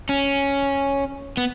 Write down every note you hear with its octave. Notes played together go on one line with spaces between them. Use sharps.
C#4
B3